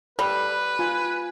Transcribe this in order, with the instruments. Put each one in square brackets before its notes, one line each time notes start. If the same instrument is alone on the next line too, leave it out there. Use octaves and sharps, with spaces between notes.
[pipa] G3 [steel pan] A4 [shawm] B4
[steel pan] F4 [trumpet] G#5